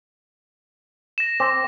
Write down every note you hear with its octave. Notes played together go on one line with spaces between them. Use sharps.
A#6 E7
C4 D6 A#6